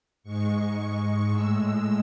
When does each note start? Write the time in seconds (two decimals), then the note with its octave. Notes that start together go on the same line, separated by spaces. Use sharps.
0.23 G#2 G#3 C#6
1.30 A2 G#3 E6